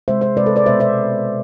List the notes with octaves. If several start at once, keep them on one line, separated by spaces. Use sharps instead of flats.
C3 G#3 C5 E5
C5 E5
C3 G#3 B4 D5
A4 C5
B4 D5
B2 G#3 C5 E5
C5 E5